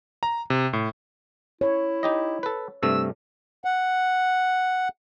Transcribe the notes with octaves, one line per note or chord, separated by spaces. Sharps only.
A#5
C3
A2
E4 C#5
D#4 G4 D#5
A4 B4
G2 C3 A3 E6
F#5